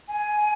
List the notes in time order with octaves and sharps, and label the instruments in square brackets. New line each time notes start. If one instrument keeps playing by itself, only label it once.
[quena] G#5